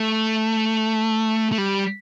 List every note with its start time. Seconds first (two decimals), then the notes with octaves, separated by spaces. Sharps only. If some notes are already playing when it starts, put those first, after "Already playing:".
Already playing: A3
1.52 A3
1.58 G3